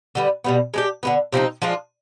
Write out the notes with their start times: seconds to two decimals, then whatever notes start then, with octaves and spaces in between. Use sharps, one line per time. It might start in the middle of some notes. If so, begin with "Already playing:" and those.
0.15 D3 G3 B3
0.44 B2 G3 B3
0.74 G#3 D4 G4
1.03 D3 G#3 B3
1.32 C3 F3 C4 D#4
1.62 F3 G#3 D4 F4